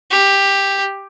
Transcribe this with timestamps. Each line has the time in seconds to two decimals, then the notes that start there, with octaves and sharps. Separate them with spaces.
0.11 G4